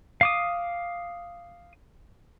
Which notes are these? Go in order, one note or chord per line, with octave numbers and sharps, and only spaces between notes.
F5 D6 D#6